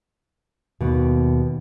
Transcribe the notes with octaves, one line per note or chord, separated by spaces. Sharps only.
D#2 B2